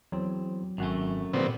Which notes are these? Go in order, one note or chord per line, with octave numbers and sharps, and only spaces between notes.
E2 F#3 C4
G#1 F#2 A3 F#4 G#5
A#2 D3 F3 G3 B3 C4